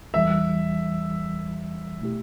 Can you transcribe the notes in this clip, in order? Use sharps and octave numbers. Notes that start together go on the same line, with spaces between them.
E2 E3 G3 E5
B2 A3 E4 G4